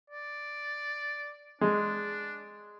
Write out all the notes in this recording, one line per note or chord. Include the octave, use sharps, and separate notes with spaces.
D5
G#3 D4